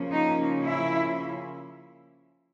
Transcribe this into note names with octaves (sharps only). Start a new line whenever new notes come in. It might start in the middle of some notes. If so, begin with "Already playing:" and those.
Already playing: C#3 F3 A#3 C#4
D#4
E4